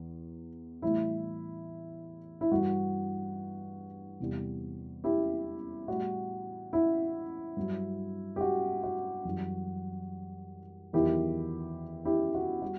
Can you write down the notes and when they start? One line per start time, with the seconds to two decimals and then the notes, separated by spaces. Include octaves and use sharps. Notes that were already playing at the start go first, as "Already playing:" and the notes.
Already playing: E2
0.82 A2 E3 G3 E4
2.41 E4
2.51 G2 E3 G3 F#4
4.20 E2 C3 E3 G3
5.04 E4 G4
5.88 A2 G3 F#4
6.73 E4
7.57 G2 F#3
8.36 G4
8.41 F#4
8.83 F#4
9.25 F#2 E3 G3
10.93 E2 D#3 F#3 E4 G4
12.05 E4 G4
12.35 F#4
12.62 G3 F#4